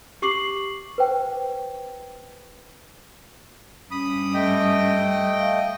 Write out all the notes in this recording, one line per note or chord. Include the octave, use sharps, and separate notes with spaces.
G4 C#6 D6 C7 F#7
B4 C5 G5
G2 G3 C#4 B5 D#6
A3 D#5 G5
F5